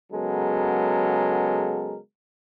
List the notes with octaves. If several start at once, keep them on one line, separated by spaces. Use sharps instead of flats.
C#3 F#3 G#3 B3 A4 A#4